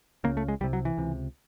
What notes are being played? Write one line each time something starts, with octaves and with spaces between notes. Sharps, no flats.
C#2 C#3 A#3
A3
G#3
C2 C3 G3
F#3
E3
C#2 C3